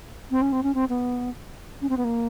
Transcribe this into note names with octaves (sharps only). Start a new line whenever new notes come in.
C4
C#4
C4
C#4
C4
B3
C#4
C4
B3
A#3